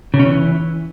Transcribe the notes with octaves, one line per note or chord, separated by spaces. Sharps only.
C#3
C#4
E3